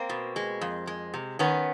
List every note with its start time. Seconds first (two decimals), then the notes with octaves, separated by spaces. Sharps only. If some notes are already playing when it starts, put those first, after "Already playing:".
Already playing: A#3 C4
0.09 B2
0.36 G#3
0.61 F2
0.87 G#3
1.14 C3
1.39 D#3 B3 C#4